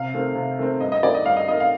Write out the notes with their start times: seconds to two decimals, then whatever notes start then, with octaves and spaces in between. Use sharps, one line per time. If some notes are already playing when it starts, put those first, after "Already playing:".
Already playing: C3 F5
0.14 D#3 A3 C4
0.35 C3
0.59 D#3 A3 C4
0.80 G2 D#5
0.92 D#5
1.03 D#3 A3 D5
1.15 D#5
1.26 G2 F5
1.37 D#5
1.48 D#3 A3 D#5
1.60 F5